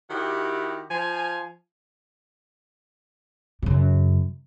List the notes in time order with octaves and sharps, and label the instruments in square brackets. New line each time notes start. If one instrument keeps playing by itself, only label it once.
[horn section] D#3 E4 F#4 G4
F3 G#5
[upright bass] F#2 C#3